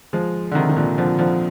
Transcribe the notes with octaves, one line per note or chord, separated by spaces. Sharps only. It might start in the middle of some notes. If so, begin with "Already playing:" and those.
F3 G#3
D3
C3 D#3
D#3
A#2 D3
D3 F3
D3 F3